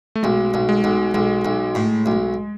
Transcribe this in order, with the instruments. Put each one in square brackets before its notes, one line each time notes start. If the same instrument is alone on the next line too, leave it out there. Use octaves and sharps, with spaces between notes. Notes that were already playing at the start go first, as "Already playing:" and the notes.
[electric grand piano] A3
[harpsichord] B1 [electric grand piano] G#3
[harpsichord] B1
[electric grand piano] G#3
[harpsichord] B1
[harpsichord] B1 [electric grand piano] G#3
[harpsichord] B1
A2
B1